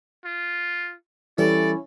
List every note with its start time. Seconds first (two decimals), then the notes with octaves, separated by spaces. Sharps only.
0.25 F4
1.38 E3 G3 C#4 E4 A4 D5